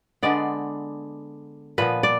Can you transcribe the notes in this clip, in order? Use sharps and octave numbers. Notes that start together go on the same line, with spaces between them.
D3 G#3 B3 D5
A#2 F3 B3 B4
D5